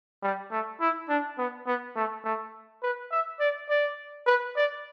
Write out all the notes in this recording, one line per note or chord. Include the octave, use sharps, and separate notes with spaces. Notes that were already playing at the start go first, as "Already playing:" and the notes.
G3
A3
E4
D4
B3
B3
A3
A3
B4
E5
D5
D5
B4
D5